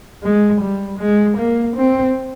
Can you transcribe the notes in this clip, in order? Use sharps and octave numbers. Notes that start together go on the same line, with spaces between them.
G#3
G3
G#3
A#3
C4